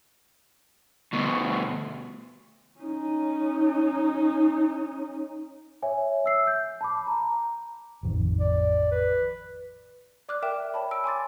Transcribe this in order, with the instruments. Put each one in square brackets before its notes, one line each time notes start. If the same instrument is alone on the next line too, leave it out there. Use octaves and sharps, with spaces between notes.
[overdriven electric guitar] D2 B2
[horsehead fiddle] C#4 D#4
[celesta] C#5 E5 G#5
E5 E6 C7
G6
A5 B5 D6
A#5
[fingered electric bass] A1 F2 D#3
[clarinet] D5
B4
[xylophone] D5 D6 F6 F#6
A#4 E5 G5 D6 E7
C#5 A5 B5
E6 D7
G#5 C6 D6 A6